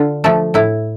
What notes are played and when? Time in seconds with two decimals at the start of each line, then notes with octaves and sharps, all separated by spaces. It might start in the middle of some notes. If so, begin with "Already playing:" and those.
Already playing: D3 F4
0.24 F3 A3 A4
0.54 A2 E4